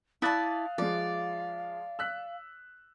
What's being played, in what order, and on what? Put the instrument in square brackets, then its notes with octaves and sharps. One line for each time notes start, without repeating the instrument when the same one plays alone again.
[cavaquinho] E4 D5 A5 [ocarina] F5 [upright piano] D#6 F#6 A6
[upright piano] F3 G#3 [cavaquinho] D5
[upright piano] E6 F#6 B6